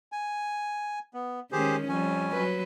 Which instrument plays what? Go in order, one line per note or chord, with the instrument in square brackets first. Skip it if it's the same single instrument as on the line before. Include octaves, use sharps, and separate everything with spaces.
[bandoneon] G#5
B3
[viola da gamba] D#3 G#3 C#4 [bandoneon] G4 G#4 C5
[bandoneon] F2 C#4 G#5 [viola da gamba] F3 G3
[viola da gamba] F#3 B4